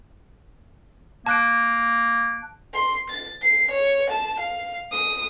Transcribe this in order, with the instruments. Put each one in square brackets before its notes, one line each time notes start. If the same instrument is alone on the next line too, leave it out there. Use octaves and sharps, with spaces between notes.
[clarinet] A#3 [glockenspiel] A5 F#6 D7
[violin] C6
A6
C7
C#5
A5
F5
D#6